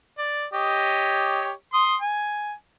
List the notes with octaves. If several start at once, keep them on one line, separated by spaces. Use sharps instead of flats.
D5
G4 C#5 D#5
C6 D#6
G#5